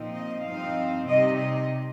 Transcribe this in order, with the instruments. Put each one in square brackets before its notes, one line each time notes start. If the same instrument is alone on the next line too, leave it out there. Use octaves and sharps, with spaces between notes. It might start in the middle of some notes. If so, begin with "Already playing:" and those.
Already playing: [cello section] A#2 F3 C4 D#4
D#5
G2 F3 C4 D#4 F5
C3 G3 C4 D#4 D#5
D#5